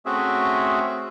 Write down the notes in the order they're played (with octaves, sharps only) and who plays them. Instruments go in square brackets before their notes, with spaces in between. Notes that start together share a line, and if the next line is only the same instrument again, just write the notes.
[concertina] A3 C4 C#4 F#4 G#4 E5